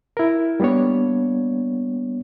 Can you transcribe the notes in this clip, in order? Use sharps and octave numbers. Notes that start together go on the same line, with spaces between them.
E4 A#4
G3 A#3 B3 D4 C#5